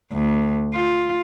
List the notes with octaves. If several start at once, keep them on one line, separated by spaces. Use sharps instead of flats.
D2
F4